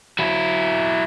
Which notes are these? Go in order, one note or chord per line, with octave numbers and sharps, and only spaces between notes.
F#3 E4